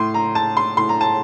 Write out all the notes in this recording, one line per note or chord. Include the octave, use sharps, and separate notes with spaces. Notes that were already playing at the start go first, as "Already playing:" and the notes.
Already playing: A2 C6
A#5
A5
C6
A2 C6
A#5
A5